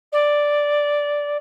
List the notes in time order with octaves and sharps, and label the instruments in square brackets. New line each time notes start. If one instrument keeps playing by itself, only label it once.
[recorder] D5